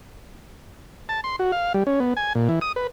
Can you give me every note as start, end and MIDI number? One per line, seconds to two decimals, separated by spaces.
1.09 1.21 81
1.24 1.36 84
1.39 1.52 66
1.52 1.73 77
1.74 1.83 55
1.87 2.00 61
2.00 2.14 59
2.17 2.33 80
2.35 2.48 46
2.49 2.59 52
2.61 2.72 87
2.76 2.87 71